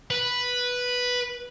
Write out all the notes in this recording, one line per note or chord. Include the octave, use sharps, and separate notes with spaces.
B4